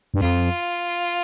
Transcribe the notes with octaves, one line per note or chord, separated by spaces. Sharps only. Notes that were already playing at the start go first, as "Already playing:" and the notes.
G2
F2 F4